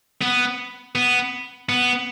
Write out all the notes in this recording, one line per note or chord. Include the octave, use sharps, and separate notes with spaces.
B3
B3
B3